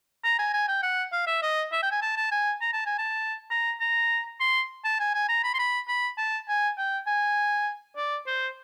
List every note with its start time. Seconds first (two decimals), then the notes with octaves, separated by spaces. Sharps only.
0.24 A#5
0.39 G#5
0.54 G#5
0.68 G5
0.83 F#5
1.12 F5
1.27 E5
1.42 D#5
1.72 E5
1.83 G5
1.91 G#5
2.02 A5
2.16 A5
2.32 G#5
2.61 A#5
2.73 A5
2.86 G#5
2.98 A5
3.51 A#5
3.80 A#5
4.40 C6
4.84 A5
5.00 G#5
5.14 G#5
5.29 A#5
5.44 B5
5.54 C6
5.59 B5
5.88 B5
6.18 A5
6.49 G#5
6.78 G5
7.07 G#5
7.96 D5
8.27 C5